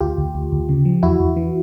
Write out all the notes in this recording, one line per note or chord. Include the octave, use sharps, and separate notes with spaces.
D2 F4 G4
D2
D2
D2
C#3
F3
E2 E4 F#4
E2
E3